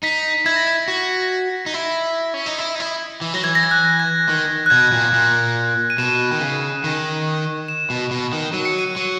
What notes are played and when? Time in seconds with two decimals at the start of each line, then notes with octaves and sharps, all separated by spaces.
0.03 D#4 B6
0.46 E4 G#6
0.56 A#6
0.67 G#6
0.88 F#4 G#6
1.66 D#4
1.74 E4
2.34 C#4
2.46 D#4
2.58 E4
2.75 D#4
2.80 E4
3.21 E3
3.34 F#3 A#6
3.44 E3 G#6
3.55 A#6
3.63 G#6
3.71 F#6
4.00 G#6
4.29 D#3
4.66 F#6
4.70 B2 G#6
4.93 A#2
5.13 A#2
5.90 D#7
5.98 B2 E7
6.31 D#3
6.41 C#3
6.84 D#3
7.68 E7
7.90 B2
8.11 B2
8.33 D#3
8.53 F#3 D#7
8.65 C#7
8.79 D#7
8.96 F#3